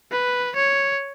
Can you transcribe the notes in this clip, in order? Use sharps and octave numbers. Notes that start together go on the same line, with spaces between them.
B4
C#5